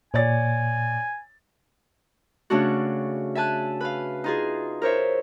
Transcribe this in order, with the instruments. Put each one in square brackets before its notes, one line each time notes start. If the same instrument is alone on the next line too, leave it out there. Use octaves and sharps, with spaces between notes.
[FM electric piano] A#2 [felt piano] C#5 D5 A6 [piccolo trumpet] G#5
[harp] C#3 A3 C#4 D4 F#4
E5 G#5 A5 F#6
B4 F5
D#4 F4 G#4
A#4 C5 C#5 E5